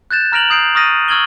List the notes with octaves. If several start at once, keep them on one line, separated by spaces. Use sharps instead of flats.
F#6 G6 A6 E7
A#5 F6 A#6 D7 F7 F#7
D#6 G6 C7 D7
C#6 D#6 F6 A6 A#6 D#7
C#6 E6 F6 G#6 F#7 G7